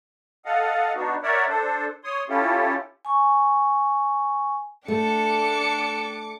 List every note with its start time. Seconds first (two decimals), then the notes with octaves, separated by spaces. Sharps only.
0.45 A4 D#5 F5 F#5
0.95 B3 D4 D#4 F#4
1.23 A#4 C#5 D5 E5 F#5
1.48 D4 A4 C5
2.04 C#5 C6 D#6
2.29 C#4 E4 F4 G4 A4
3.05 G#5 C#6
4.88 A3 D4 A4 G5 D6 C#7